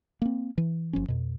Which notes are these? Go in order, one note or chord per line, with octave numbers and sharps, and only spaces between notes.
A#3 C4
E3
F#1 F3 C#4
F2 B2